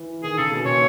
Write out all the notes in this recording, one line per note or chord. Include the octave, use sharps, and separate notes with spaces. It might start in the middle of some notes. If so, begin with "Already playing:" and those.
Already playing: E3
D#3 G#4
C#3 A4
B2
A#2 C#5